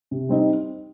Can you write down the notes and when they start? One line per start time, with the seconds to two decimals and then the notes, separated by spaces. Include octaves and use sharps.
0.11 C3
0.29 G3 C4 D#4